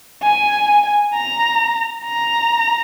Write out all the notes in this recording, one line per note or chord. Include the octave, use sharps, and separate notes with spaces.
G#5
A#5
A#5